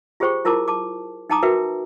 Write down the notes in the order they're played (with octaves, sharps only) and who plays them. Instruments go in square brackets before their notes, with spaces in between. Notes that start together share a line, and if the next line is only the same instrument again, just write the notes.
[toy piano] F4 G4 G#4 C5 G5 C#6
E4 F4 A#4 A5 D6
A5 D6
D#4 G5 A5 A#5 D6 D#6
F#4 A#4 B4 E5 G5